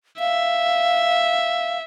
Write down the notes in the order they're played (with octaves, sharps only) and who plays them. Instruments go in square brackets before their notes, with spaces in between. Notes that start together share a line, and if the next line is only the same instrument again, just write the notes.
[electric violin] E5 [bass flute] F5